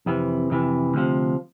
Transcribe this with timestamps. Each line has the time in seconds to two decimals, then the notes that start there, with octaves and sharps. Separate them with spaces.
0.06 F2 C3 E3
0.50 F2 C3 E3
0.94 D2 C3 F3